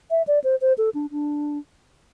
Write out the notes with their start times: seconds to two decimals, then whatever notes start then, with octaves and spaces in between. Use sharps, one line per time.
0.11 E5
0.27 D5
0.44 C5
0.61 C5
0.78 A4
0.94 D4
1.11 D4